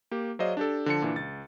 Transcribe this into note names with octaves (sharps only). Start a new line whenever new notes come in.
A#3 G4
F#3 G#4 C5 D5 D#5 F5
D4 G4 A4
D3 F3 A5 C#7
A#2 E3 D4
C#2 A6